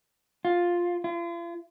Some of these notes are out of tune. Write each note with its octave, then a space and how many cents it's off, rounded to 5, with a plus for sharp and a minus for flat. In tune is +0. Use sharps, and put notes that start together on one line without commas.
F4 +5
F4 -40